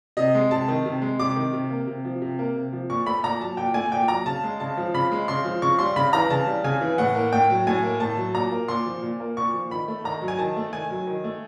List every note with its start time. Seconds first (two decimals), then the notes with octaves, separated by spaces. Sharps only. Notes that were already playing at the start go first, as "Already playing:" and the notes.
0.17 C3 D#5
0.35 G#3
0.51 C3 A5
0.68 D#3
0.85 C3
1.02 G#3
1.19 C3 D6
1.36 D#3
1.53 C3
1.70 A#3
1.87 C3
2.05 F3
2.22 C3
2.39 A#3
2.56 C3
2.73 F3
2.90 A#2 C#6
3.06 A3 B5
3.24 A#2 A#5
3.41 F#3 A5
3.57 A#2 G5
3.74 A3 G#5
3.92 A#2 G5
4.08 F#3 A#5
4.26 C#3 A5
4.43 G#3
4.60 C#3 A5
4.77 F3
4.94 C#3 B5
5.12 G#3
5.28 C#3 C6
5.44 F3
5.62 C#3 C#6
5.79 G3 C6
5.96 C#3 B5
6.13 E3 A#5
6.30 C#3 A5
6.47 G3
6.64 C#3 G#5
6.81 E3
6.98 A2 F#5
7.15 A#3
7.33 A2 G5
7.50 F#3
7.67 A2 G#5
7.83 A#3
8.00 A2 A5
8.17 F#3
8.34 A#2 A#5
8.52 A#3
8.68 A#2 C6
8.86 F3
9.03 A#2
9.20 A#3
9.37 A#2 C#6
9.54 F3
9.70 D#3 B5
9.88 A3
10.04 D#3 A#5
10.22 F#3
10.28 G#5
10.38 D#3 A5
10.56 A3
10.73 D#3 G#5
10.90 F#3
11.07 D#3
11.24 A3